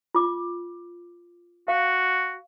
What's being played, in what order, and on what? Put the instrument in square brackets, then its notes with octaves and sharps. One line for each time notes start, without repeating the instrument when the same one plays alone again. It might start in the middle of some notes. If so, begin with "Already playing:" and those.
[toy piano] F4 D6
[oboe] F#4 [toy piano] F5